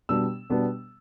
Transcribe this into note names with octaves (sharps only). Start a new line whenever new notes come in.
B2 G3 B3 D4 E6
B2 G3 B3 D4